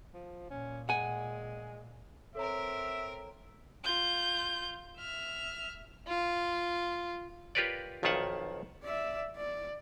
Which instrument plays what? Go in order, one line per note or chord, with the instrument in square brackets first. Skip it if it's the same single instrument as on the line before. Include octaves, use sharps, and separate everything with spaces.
[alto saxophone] F3
[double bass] A#2 [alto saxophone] C#4
[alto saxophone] G#3 [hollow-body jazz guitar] F#5 G#5
[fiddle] C4 A#4 [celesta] A4 C#5 A#5 [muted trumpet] E5
[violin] F4 G6
E5 F6
[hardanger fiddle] F4
[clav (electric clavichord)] F4 G4 A#4 B4 C#5 D5
B1 F2 D#3 F4 E5 F#5
[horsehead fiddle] D5 E5
D5